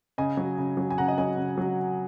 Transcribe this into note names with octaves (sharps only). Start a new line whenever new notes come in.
C#3 D#5 G#5
F#3
C#3
F#3
G#5
C#3 F#5 A#5
D#5 G#5
F#3 D#5 G#5
C#3
F#3